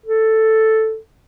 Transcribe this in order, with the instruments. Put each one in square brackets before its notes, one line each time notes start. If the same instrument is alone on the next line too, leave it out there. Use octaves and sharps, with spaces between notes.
[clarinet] A4